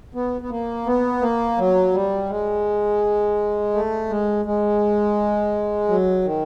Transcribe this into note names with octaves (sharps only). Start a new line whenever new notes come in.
B3
B3
A#3
B3
A#3
F#3
G3
G#3
A3
G#3
G#3
F#3
D#3